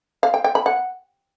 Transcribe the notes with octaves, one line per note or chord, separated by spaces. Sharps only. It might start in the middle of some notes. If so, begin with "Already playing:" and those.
F5
G5
G5
B5
F#5